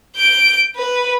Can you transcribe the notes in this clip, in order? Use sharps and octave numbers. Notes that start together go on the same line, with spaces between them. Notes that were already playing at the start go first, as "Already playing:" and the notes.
G6 D7
B4